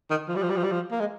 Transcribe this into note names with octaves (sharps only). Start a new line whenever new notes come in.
D#3
F3
G3
F3
G3
F3
G3
F3
A#3
G#3